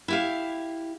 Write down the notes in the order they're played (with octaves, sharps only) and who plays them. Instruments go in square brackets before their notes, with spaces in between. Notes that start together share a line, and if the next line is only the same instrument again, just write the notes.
[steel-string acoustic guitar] E4 G4 F5